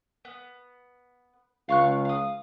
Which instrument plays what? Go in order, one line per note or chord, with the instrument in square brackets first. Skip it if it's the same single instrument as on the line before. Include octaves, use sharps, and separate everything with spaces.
[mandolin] B3
[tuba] C#2 [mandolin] F5 C#6 F#6
[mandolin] F5 D#6